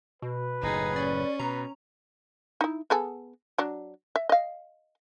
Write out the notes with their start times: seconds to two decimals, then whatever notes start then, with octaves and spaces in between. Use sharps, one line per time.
0.22 B2 B4
0.63 F#1 A2 D#4 G#4
0.96 C#4 D5
1.40 B2 B4 A#5
2.61 D#4 E4
2.90 B3 G#4 A4
3.58 F#3 D4
4.16 E5
4.29 D#5 F5